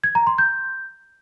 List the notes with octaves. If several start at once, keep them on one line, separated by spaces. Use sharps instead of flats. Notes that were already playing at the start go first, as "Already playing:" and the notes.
G#6
A#5
C6
G6